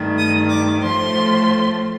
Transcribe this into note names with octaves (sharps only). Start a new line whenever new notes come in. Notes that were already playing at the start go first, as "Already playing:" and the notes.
Already playing: G2 D#3 A3
D#6
D6
A2 F3 A3 C6